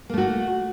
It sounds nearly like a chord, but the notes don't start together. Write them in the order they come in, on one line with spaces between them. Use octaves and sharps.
A#3 A3 F#4